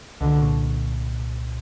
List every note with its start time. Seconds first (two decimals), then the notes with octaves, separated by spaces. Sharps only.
0.21 C2 D3
0.42 A#2